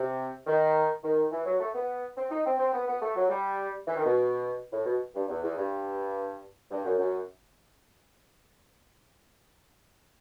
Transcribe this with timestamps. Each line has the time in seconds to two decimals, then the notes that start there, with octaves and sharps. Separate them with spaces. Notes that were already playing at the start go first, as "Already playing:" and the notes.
Already playing: C3
0.47 D#3
1.04 D#3
1.31 E3
1.45 F#3
1.60 A3
1.74 B3
2.17 C4
2.30 D#4
2.45 C4
2.59 C4
2.73 B3
2.87 B3
3.02 A3
3.16 F#3
3.29 G3
3.87 E3
3.97 D#3
4.05 B2
4.72 A2
4.86 B2
5.15 G2
5.29 E2
5.42 E2
5.57 G2
6.71 G2
6.84 F#2
6.99 F#2